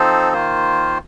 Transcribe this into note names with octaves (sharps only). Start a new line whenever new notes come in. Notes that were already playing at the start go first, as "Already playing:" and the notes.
Already playing: F3 C4 D#4 A4 C5
D#3 A#3 F4 C5